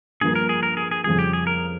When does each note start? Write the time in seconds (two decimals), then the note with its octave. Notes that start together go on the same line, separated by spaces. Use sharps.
0.21 G2 F3 A#3 G#4
0.35 A#4
0.49 G#4
0.63 A#4
0.77 G#4
0.91 G#4
1.04 F2 C#3 G3 G#4
1.19 G4
1.33 G#4
1.47 A#4